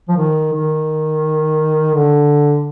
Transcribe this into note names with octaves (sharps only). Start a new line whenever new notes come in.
F3
D#3
D#3
D3